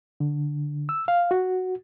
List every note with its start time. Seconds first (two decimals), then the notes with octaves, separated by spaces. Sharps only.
0.20 D3
0.89 E6
1.08 F5
1.31 F#4